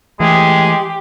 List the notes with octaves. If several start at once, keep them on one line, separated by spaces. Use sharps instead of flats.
E3 G#3 A3 G4 G#4